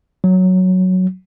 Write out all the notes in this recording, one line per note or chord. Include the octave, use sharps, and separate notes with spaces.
F#3